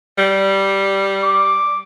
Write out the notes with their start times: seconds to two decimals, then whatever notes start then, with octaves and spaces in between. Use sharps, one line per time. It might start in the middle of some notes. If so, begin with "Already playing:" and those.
0.18 G3
1.24 D6